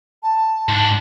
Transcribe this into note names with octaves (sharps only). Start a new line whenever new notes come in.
A5
G#2 D4